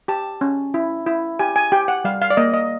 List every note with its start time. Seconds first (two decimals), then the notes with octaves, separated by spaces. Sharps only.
0.08 G4 A5
0.41 C#4
0.74 E4
1.07 E4
1.39 G4 G#5
1.56 G#5
1.72 G4 G5
1.88 F#5
2.05 G3 F5
2.22 F5
2.30 D5
2.37 A#3 D#5
2.54 D#5